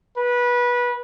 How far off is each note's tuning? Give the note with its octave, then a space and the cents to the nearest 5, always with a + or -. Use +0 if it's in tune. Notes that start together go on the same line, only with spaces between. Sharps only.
B4 -20